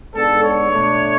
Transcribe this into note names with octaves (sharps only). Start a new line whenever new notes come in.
G#2 G#3 B3 D4 A4
C#5
B2 A3 D4